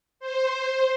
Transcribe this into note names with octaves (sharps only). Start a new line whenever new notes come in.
C5